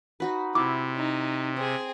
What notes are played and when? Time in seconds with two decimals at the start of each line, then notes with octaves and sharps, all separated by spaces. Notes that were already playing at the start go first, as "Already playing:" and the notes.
0.20 D#4 F#4 B4
0.55 C3 E4 D6
0.96 D#4
1.56 C4 G#4 D#5